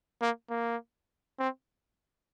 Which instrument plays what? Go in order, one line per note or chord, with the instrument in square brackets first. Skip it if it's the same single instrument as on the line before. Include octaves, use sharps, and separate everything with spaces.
[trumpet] A#3
A#3
C4